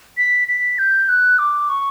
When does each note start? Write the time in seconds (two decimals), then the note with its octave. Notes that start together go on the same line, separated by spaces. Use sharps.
0.17 B6
0.48 B6
0.79 G6
1.09 F#6
1.39 D6
1.69 C#6